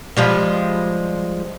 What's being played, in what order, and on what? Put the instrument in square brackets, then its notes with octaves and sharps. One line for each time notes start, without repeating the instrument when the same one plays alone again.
[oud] F3 G3 G#3